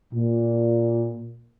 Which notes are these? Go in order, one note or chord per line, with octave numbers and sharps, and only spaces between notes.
A#2